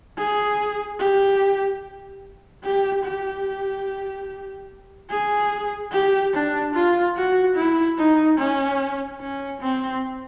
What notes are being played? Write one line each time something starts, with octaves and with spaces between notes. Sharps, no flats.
G#4
G4
G4
G4
G#4
G4
D4
F4
F#4
E4
D#4
C#4
C#4
C4